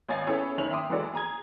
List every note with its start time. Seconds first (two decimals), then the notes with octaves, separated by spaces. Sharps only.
0.08 G#1 C#5 D#5 F5 G#5 A6
0.27 B3 C#4 E4 G#4 A4 C#5
0.58 F#1 D#3 C#5 G#5 F7 F#7
0.70 E5 G5 C6 D6 D#6
0.89 F#1 E3 G#3 F#4 A4 D5
1.14 G#4 A#5 D#6 G#6